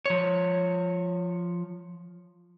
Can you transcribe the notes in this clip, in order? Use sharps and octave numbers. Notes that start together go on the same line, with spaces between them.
F3 C#5